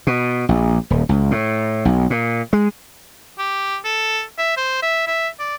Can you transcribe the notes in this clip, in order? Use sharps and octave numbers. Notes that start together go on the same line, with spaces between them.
B2
A#1
D#1
C#2
A2
B1
A#2
G#3
G4
A4
E5
C5
E5
E5
D5